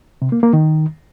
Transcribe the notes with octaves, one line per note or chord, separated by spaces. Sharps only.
C3
A#3
A#3
D#3